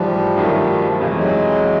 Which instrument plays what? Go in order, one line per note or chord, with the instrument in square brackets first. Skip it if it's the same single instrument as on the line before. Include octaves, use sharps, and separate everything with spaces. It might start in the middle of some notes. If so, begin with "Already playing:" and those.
Already playing: [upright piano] G#2 E3 A3 [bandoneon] F3 G3
[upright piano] G2 D#3 F#3 A3
[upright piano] F2 C3 E3 [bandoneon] G#3
[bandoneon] A3
F#3 G#3
[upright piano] E3